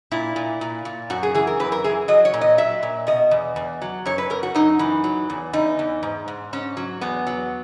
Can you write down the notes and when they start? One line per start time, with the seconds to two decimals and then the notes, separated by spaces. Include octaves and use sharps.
0.11 A#2 E4
0.36 A#2
0.61 A#2
0.85 A#2
1.10 F#2 F#4
1.23 G#4
1.35 E3 G#4
1.47 A#4
1.60 F#2 B4
1.72 A#4
1.84 E3 G#4
2.08 F#3 D#5
2.25 C#5
2.34 A#2
2.41 D#5
2.58 F#3 E5
2.83 A#2
3.07 B2 D#5
3.31 E2
3.56 E2
3.82 F#3
4.06 F#2 C#5
4.18 B4
4.30 F#2 A#4
4.43 F#4
4.55 F#2 D#4
4.79 E3
5.04 F#3
5.30 E2
5.53 E2 D#4
5.79 E2
6.03 G#2
6.28 G#2
6.53 G#2 C#4
6.77 F#3
7.01 E2 B3
7.27 F#3